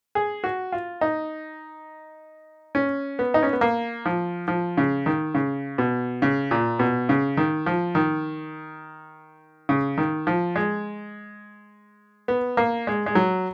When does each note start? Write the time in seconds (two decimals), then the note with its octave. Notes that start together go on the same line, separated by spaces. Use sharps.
0.15 G#4
0.44 F#4
0.72 F4
1.01 D#4
2.75 C#4
3.19 B3
3.34 D#4
3.43 C#4
3.53 B3
3.61 A#3
4.06 F3
4.48 F3
4.77 C#3
5.06 D#3
5.35 C#3
5.78 B2
6.22 C#3
6.51 A#2
6.79 B2
7.09 C#3
7.37 D#3
7.66 F3
7.95 D#3
9.69 C#3
9.98 D#3
10.27 F3
10.56 G#3
12.28 B3
12.57 A#3
12.87 G#3
13.06 G#3
13.15 F#3